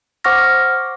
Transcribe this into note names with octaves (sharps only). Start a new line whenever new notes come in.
C5 F#5 C#6 D6 F6 A#6